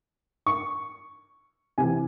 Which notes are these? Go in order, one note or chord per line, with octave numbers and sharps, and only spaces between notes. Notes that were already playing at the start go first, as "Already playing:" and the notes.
C#6
C3 E3 G#5